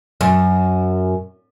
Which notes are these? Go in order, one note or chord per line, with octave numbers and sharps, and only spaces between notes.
F#2